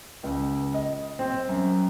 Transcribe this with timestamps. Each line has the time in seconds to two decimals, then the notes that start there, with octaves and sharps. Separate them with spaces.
0.23 C#2
0.74 D#5
1.19 C4
1.49 F#2